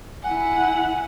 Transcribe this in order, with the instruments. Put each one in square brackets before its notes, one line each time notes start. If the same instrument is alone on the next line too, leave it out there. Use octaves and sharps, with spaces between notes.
[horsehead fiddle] E4 F#5 [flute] G#5